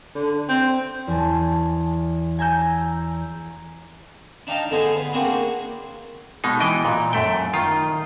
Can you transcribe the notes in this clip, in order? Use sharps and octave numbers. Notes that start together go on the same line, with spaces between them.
D3
C4
E2 G#5 A5
G#5 A#5 E6 G6
D4 D#4 F5 G5 A5 A#5
D3 B3 G#4 C5 G#5
B3
A#3 C4 D4 F#4 G#4
B2 G#3 D#4
E3 B3 D#5 G5
A#2
F#2 A3 G5
D#3 F4